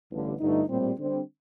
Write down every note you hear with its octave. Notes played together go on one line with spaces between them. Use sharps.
A1 G2 D3
G1 G2 D3 A3 D#4
A#1 A2 G3 C4
D3 G3 C4